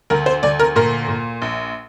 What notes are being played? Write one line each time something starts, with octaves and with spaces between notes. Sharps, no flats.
D2 A#4
C5
D2 D5
A#4
A#2 A#4
A#2
A#1